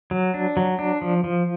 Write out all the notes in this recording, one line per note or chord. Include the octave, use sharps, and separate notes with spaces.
F#3
D4
F#3
D4
F3
F3